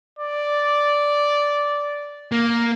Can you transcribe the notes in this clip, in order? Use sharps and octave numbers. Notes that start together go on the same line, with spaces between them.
D5
A#3